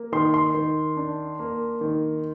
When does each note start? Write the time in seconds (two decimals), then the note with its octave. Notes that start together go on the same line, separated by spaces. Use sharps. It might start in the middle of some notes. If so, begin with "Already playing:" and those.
Already playing: A#3
0.12 D#3 C6
0.34 C6
0.54 D#3
0.97 D4
1.39 A#3
1.81 D#3